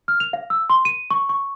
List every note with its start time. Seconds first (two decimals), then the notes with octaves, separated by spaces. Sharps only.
0.08 F6
0.20 F7
0.33 F5
0.50 E6
0.70 C6
0.85 D#7
1.11 C#6
1.29 C#6